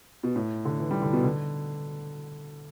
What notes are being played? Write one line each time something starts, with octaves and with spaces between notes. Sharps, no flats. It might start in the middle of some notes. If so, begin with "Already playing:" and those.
B2
A2
D3
E3
G3
D3
B2
D3